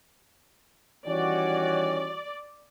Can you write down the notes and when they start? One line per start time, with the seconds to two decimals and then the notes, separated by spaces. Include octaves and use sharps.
1.07 D#3 E3 G3 C#4 F#4 C#5 D5